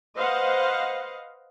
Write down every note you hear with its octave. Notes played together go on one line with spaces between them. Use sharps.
B4 C5 D#5 F5 F#5